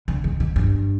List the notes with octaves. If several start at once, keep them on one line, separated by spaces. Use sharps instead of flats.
D3
D#3
D#3
G2